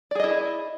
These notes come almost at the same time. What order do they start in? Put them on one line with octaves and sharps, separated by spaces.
D5 G#4 D#5 E4